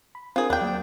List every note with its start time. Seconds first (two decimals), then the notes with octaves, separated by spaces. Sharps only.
0.15 B5
0.36 C4 D4 F4 G#4 A#4
0.50 D#2 D4 G5
0.61 F#3 A#3